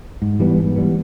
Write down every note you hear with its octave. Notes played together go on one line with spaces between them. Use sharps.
G#2
E3 G3 B3
G#2
E3 G3 B3